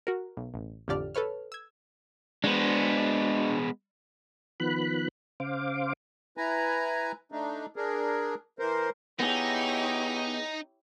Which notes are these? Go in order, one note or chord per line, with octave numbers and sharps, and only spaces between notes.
F#4 A#4
B1
A1
A1 F2 D3 G4 D5 F6
A4 B4 C#5 F6
E6 G#6
G#3 B3 D4 F#4 C5
D#3 F3 B3 B5 F#6
C#3 C5 F5 D6
E4 B4 G#5 A#5
A3 D4 D#4
D4 G#4 A#4
E3 A#4 C5
B3 D#4 E4 G4 G#4 C#5